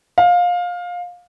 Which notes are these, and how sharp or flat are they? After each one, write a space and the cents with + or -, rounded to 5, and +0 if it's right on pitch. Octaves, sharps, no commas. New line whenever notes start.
F5 +20